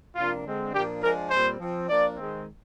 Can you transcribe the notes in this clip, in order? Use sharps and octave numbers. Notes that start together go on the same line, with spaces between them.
C3 F3 A#3 D4 F4
D3 G#3 C4
A#2 F3 A#3 D4 G4
F3 G#3 D4 A#4
A#2 G3 C4 C5
F3 C4
F3 A#3 D4 D5
D#3 G#3 C4